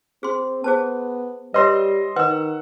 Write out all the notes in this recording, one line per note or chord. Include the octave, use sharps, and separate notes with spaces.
C4 G#4 C6
B3 G#4 C5 A5
G3 B4 C#5 D#5 E5 C6 E6
D#3 B4 D#5 F#5 E6